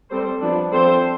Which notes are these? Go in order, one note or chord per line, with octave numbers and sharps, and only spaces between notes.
G3 C4 A4 C5
F3 B3 D4
F3 C4 A4 C5